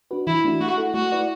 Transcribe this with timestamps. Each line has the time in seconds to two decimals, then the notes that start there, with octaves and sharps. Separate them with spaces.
0.11 D4 F#4 B4
0.27 E3 E4
0.44 A3 D4 F#4
0.60 A3 F#4
0.78 E4 A4
0.94 A3 F#4
1.12 E4 B4 D5